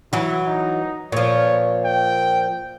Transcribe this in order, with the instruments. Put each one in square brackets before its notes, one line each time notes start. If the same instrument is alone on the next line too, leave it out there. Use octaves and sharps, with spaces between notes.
[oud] E3 F#3 [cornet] E4
[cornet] D#4
[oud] A#2 F3 [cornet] C#5
[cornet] G5